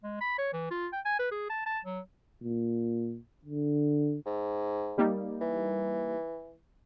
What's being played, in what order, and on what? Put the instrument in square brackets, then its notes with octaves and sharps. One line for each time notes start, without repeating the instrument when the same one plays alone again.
[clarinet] G#3
B5
C#5
E3
F4
G5
G#5
B4
G#4
A5
A5
F#3
[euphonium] A#2
D3
[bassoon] G#2
[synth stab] G3 A#3 D#4
[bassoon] E3